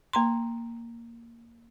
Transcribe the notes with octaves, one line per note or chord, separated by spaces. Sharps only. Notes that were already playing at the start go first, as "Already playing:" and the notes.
A#3 A#5 C6